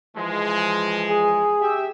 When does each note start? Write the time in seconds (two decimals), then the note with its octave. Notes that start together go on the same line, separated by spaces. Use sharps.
0.16 E3 F3 G#3
1.10 G#4
1.60 G4 E5